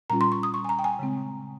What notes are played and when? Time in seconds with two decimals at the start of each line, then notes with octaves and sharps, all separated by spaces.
0.10 A#2 G3 C#4 F4 A#5
0.21 C6
0.32 C#6
0.43 D#6
0.54 C#6
0.65 G#5
0.69 A#5
0.79 G5
0.84 G#5
0.99 C#3 G#3 C4